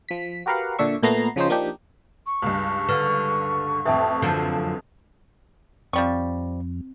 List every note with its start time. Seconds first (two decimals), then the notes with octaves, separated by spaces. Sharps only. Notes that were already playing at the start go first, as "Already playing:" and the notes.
0.09 F3 B6
0.46 F#4 G4 A#4 B4 F5 F#5
0.79 A#2 D3 D4 E5 C#6
1.03 A#2 A3 B3 A#5 C7
1.36 C#3 F3 C#4 D#4 C5
1.49 F3 A#3 D4 D#4 G4
2.26 C#6
2.42 C#2 G2
2.89 D3 B4 F6
3.85 A1 F2 E5 G5 A5
4.22 F#2 D3 F3 A5
5.93 F2 F3 G3 C4 C#6